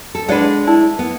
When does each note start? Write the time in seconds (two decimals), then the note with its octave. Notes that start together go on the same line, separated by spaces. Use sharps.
0.15 A4
0.29 G#3 D4 B4 D5 F#5
0.67 E4 A5
0.99 B3